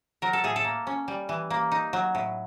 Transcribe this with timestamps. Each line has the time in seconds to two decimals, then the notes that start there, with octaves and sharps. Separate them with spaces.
0.22 F#3 A#4
0.33 A4
0.44 A2 G#4
0.56 A4
0.64 A#3
0.87 C#4
1.08 G3
1.29 E3
1.50 A#3
1.72 D#4
1.93 F#3
2.15 A2